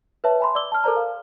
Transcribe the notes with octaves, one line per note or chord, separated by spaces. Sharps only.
B4 C#5 E5 A5
G#5 B5 C6
D5 D6 E6 G7
A5 F6
A4 A#4 C5 D5 A#5
F5